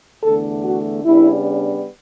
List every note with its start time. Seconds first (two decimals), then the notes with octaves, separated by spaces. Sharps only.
0.23 E2 D3 A3 A4
0.62 F#4
1.03 C#3 G3 B3 D4 E4